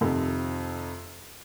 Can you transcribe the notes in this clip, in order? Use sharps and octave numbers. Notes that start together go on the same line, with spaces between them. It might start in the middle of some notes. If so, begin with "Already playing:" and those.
F2 C3 D#3